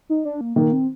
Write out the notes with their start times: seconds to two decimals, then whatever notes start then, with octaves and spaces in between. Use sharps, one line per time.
0.09 D#4
0.25 D4
0.41 A#3
0.56 D#3 A#3
0.73 C4